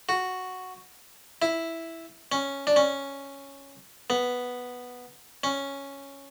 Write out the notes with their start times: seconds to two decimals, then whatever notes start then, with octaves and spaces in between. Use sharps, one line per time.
0.09 F#4
1.42 E4
2.32 C#4
2.67 D4
2.76 C#4
4.10 B3
5.44 C#4